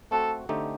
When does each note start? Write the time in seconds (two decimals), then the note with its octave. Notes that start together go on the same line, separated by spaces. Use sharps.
0.11 A3 C4 F#4 A4
0.49 D3 A3 C4 D#4 G4